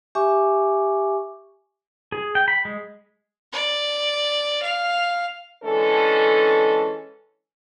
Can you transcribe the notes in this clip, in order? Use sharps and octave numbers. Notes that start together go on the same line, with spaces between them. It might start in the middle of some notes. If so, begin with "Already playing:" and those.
G4 E5 G#5 C#6 D6
G#4
G5
B5
G#3
D5
F5
D3 E3 G#3 C#4 A4